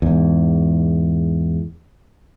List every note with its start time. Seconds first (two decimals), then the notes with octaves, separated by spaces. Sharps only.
0.02 E2 G#2